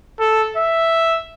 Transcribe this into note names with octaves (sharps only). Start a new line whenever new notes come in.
A4
E5